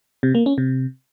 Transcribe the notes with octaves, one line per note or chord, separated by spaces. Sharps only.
C3
A#3
C#4
C3